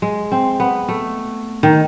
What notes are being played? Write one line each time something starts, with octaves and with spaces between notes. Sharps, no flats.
G#3
C4
B3
A3
D#3